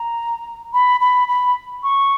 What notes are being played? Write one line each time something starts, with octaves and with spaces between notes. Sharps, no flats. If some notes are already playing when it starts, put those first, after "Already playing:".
Already playing: A#5
B5
B5
B5
C#6